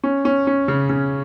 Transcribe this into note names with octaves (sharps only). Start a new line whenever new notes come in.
C#4
C#4
C#4
C#3
C#3